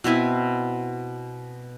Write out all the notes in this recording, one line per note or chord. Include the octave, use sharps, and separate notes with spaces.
B2 C4 E4 G#5